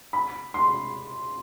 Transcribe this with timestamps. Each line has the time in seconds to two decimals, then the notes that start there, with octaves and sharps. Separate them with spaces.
0.13 B5
0.54 C6